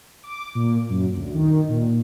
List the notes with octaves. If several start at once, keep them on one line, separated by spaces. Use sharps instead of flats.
D6
A#2
F#2
D2
D#3
A#2